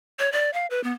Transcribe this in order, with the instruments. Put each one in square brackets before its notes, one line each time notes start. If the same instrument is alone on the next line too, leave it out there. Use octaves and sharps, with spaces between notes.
[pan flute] C#5
D5
F5
B4
B3